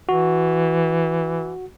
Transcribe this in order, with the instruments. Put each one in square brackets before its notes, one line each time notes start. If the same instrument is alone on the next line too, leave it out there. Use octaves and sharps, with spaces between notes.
[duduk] E3 [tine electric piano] F#4